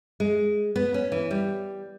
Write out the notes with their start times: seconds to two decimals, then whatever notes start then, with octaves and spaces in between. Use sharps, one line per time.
0.20 G#3
0.76 B3
0.94 C#4
1.12 E3
1.31 G3